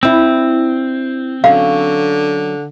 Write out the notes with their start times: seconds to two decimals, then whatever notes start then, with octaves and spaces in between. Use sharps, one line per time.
0.03 C4 D4 E4
1.44 D3 F#3 C#4 F5